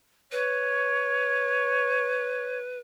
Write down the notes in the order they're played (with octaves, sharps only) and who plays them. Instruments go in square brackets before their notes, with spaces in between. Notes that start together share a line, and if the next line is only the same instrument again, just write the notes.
[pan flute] B4 [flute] C#5